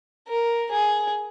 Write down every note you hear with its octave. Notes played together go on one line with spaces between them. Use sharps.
A#4
G#4